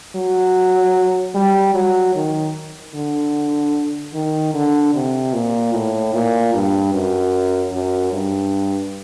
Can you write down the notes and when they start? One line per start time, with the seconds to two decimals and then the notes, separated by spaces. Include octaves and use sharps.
0.16 F#3
1.35 G3
1.75 F#3
2.15 D#3
2.95 D3
4.14 D#3
4.54 D3
4.95 C3
5.33 A#2
5.74 A2
6.14 A#2
6.54 G2
6.93 F#2
7.73 F#2
8.13 G2